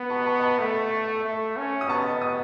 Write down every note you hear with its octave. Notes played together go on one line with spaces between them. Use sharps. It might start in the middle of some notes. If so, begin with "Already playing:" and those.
Already playing: B3
A5 C#6
A5 C#6
A5 C#6
A3
A3
C#4
D#6
B3 A5 C#6
D#6